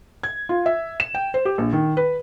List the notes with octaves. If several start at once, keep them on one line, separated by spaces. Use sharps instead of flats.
G#6
F4
E5
E7
G5
C5
G4
A#1
D#3
B4